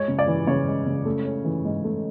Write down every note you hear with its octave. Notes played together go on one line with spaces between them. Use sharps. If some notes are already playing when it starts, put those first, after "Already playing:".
Already playing: G#3 C#5
C#3
D5
E3
C#3 C#5
G#3
C#3
A3
C#4
E3
G#2
A3